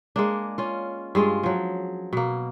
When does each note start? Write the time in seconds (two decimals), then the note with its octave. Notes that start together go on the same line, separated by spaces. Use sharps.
0.16 G#3 A#3 D4
0.58 C#4 F4
1.15 G2 G#3 F4 G#4
1.43 F3 F#3
2.13 B2 A#3